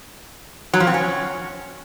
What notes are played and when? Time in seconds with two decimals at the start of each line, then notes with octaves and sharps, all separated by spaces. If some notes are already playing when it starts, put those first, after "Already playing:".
0.74 F#3
0.80 F3
0.87 C4
0.94 C#4